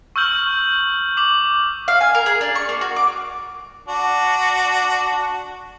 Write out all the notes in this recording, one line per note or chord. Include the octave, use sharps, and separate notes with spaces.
C#6 E6 F6 G6 F#7
D6 F#7
F5
G#5
A#4
G#4
D4
C#6
A#3
F#4
D6
D4 F#4